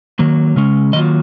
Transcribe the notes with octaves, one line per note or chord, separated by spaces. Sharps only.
D#3 F#3 A#3
C#3 G#3 C#4
D#3 F#3 A#3 F4 D#5